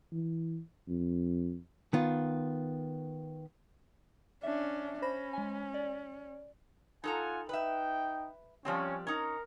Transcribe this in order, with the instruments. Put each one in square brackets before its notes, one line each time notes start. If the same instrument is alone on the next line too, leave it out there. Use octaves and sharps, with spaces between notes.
[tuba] E3
F2
[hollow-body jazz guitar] D#3 B3 F4
[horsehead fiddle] C#4 D4 [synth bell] E5
[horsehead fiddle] C#4 [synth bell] C5 B5 A#6
[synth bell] G#3 G#5
D5
[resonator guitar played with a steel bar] D#4 A4 A#5 [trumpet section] F4 F#5 G#5
[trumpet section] D#4 G5 [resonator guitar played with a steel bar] B4 E5
[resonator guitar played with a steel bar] F3 G3 C4 [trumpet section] C#4
[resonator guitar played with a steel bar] C#4 D#4 [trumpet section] A#4 A#5